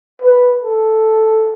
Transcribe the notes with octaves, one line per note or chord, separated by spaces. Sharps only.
B4
A4